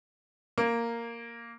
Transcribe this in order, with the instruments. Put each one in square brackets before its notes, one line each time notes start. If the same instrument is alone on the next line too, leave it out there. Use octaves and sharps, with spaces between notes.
[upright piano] A#3